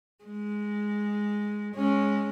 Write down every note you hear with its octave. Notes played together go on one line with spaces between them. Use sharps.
G#3
G#3 C#4